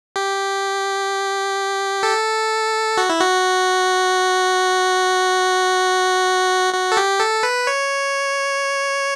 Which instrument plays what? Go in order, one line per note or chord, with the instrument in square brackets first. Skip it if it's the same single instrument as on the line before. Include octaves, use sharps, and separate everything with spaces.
[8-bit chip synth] G4
A4
F#4
E4
F#4
F#4
A4
G4
A4
B4
C#5